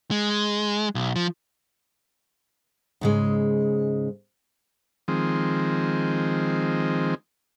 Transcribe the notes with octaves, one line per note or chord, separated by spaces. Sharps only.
G#3
B1
F3
G#2 C#3 G#3
D#3 F3 G#3 C4